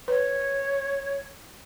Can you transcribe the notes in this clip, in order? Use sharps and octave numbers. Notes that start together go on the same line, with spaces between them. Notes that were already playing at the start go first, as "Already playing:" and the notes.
B4 C#5